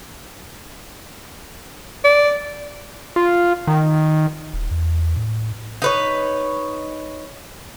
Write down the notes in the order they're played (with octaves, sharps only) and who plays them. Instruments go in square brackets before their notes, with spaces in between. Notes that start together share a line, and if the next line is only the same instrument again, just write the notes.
[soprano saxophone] D5
[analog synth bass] F4
D#3
[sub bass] D#1
E2
A2
[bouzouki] D#4 B4 C#5